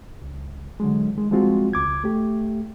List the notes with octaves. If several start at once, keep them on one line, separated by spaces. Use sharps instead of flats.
C#2
D3 F#3 G#3
D#3 G#3
F3 G3 G#3 C4 F4 F#4
C#2 D6 G#6
A3 G4